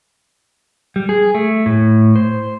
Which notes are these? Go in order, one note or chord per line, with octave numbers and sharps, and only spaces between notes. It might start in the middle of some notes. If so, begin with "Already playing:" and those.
G3
G#4
A3
A2
C5